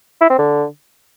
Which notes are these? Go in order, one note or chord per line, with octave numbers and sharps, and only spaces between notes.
E4
C4
D3